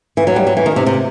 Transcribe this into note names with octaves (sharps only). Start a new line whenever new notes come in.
E3
F#3
G3
F#3
E3
D#3
C3
C3